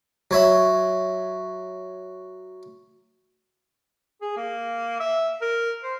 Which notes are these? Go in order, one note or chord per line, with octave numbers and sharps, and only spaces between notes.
F#3 C#5 E5 B5
G#4
A#3
E5
A#4
C5